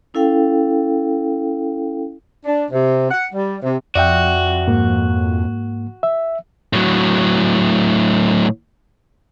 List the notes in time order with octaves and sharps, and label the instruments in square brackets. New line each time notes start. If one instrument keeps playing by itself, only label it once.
[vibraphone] C#4 E4 A4 F5 G5
[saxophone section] D4
C3
F#5
G3
C3
[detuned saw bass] F2 [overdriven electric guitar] F#4 [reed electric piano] D5 E5 G5
[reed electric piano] G#2 A#3
E5
[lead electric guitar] A2 F#3